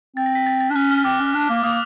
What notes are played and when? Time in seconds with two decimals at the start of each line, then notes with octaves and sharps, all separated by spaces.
0.16 C4 A6
0.26 A#6
0.35 B6
0.46 A6
0.61 A6
0.70 D4
0.75 C#4 F#6
0.91 F6
1.05 C4 D6
1.20 C#4
1.34 D4
1.50 A#3
1.63 A#3 D#6